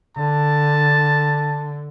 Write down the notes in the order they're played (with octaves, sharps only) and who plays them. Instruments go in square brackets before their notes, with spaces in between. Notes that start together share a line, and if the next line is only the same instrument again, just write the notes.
[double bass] D3 [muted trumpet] A5